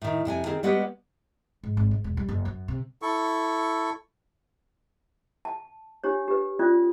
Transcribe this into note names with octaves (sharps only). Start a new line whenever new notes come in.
A2 D#3
F2 C3 G5 G#5
D#3 C4 G#4
G3 G#3 B3 F#4 G4 B4
G#2
G#1
G#2
E1
G3
F#1
F#2
C3
E4 A4 C#6
A5
D4 G4 C#5
G4 B4
C#4 F4 D5 D#6